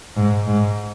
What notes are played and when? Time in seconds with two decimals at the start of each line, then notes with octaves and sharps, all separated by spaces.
0.17 G#2
0.47 G#2